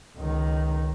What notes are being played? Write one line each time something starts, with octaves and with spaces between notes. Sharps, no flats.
C#2 D#3